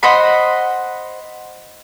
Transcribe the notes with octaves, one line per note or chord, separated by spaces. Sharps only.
C5 D#5 F#5 B5